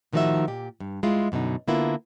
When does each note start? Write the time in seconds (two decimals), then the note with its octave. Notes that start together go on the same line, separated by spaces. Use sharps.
0.13 A2 D#3 F3 D#4 F#4 E5
0.48 A#2 G4
0.80 G2
1.03 G#3 E4 F4
1.32 F#2 B2 D3 D#4
1.67 D3 A#3 B3 E4 F4